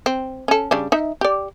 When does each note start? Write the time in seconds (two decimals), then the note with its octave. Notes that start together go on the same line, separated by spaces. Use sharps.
0.06 C4
0.48 C#4 A4
0.71 C#3 G3 D4
0.92 D#4 E5
1.21 G4 D5